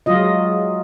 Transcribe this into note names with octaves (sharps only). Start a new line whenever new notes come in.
F#3 G#3 F4 D#5